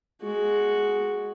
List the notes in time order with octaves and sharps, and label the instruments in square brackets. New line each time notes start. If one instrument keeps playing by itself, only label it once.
[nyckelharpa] G#3 F#4